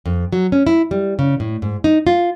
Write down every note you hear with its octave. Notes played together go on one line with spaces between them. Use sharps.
F2
F#3
C#4
E4
G3
C#3
A2
G#2
D#4
F4